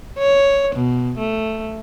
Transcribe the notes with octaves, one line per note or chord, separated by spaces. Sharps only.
C#5
B2
A3